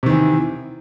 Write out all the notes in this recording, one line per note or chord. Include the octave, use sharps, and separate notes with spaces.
C3 D#3 E3